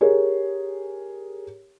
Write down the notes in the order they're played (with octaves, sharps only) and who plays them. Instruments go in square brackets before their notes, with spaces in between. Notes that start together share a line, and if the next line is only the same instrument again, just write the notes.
[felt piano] G4 G#4 A#4 C#5